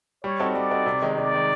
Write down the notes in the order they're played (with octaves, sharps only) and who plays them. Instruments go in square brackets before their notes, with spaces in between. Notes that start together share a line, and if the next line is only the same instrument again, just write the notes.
[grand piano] G3 [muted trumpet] C#5
[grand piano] C4 D#4 F#4 A4
[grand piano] G3 [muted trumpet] D5
[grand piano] C4 D#4 F#4 A4
C3
D#3 G#3
[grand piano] C3 [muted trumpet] D5
[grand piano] D#3 G#3